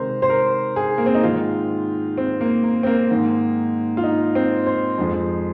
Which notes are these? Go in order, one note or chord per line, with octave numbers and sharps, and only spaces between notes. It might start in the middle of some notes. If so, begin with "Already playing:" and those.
Already playing: C3 D#3 G#3 A#4 C5
C5
A#4
G#4
A#3
C4
D#4
G#2 D#3 G#3 F4
C4
A#3
A#3
C4
A#3
G#2 D#3 G#3
F4
D#4
C4
C5
F2 F3 G#3